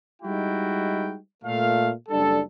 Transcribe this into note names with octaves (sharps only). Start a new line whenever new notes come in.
G3 G#3 D#4 E4 F#4 G5
A#2 A3 F5
F#1 G3 D4 A4